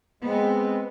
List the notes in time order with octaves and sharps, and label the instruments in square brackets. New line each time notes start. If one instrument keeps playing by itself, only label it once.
[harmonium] G#3 C4 [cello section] B3